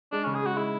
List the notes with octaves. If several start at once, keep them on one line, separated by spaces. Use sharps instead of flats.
G#3 D4
C#3 C#4
G#4
G#3 F#4
G#3 E4